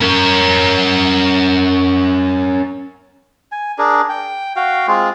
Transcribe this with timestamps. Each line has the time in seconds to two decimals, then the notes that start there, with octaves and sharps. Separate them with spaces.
0.01 C#4 A#4
3.52 G#5
3.78 D4 G#4 A#4
4.09 G5
4.56 F#4 F5 G5
4.88 G#3 C4 F4